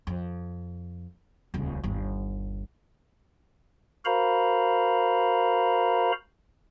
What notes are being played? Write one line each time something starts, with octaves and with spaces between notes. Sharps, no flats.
F2
D#1 C#2
G1 D#2
F#4 A#4 C5 F5 A#5 B5